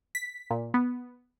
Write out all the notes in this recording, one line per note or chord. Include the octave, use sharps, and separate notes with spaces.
B6
A#2
B3